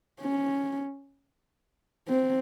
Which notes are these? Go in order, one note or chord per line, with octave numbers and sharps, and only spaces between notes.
C#4
C4